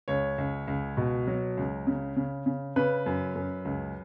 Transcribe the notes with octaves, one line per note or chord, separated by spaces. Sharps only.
C#2 C#5
C#2
C#2
B2
F#3
C#2
C#3
C#3
C#3
C#3 B4
F#2
F#2
C#2